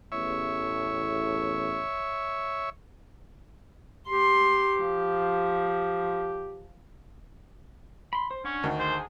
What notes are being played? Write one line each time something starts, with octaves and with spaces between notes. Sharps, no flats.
A1 E2 A2 C#5 E5
G4 C6
F3
B5 C6
C5
C#4 D4 F#5 C#6
D2 D#3
G#4 C5